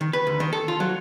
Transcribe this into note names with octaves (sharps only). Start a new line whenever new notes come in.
D#3
B4
D2
D#3
A4
F4
F#3